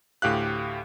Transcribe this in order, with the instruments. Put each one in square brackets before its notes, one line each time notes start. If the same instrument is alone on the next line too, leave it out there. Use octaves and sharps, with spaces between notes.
[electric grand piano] D2 A2 G4 F5 F#6